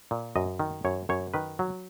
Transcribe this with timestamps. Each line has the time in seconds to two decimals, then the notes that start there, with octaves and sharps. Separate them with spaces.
0.11 A#2
0.36 F#2 D#5
0.59 D#3
0.85 F#2 C#5
1.09 F#2 C#5
1.34 D#3 B4
1.59 F#3